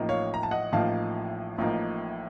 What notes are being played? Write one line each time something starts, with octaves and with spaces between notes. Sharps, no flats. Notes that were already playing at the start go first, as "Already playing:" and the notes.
Already playing: A1 A2 F3 A#3 D#4
C#5 F5
A#5
A5
D#5 F#5
A1 A2 F3 A#3 D#4 F5 A5
A1 A2 F3 A#3 D#4